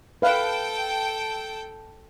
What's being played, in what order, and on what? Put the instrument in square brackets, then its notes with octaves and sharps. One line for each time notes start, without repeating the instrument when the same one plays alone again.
[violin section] A4 G5 [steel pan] B4 F5